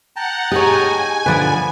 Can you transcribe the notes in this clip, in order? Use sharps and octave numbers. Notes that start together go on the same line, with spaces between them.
F#5 G5 A5 A#5
D#4 G4 G#4 C#5 G#5
D3 F3 B3 B4 D5 F#5